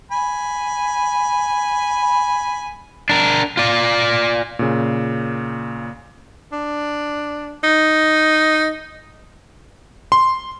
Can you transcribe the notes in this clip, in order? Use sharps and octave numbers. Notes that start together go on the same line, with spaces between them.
G#5 B5
D4 A#4
F4 D5
A#2 C#3
D4
D#4
C6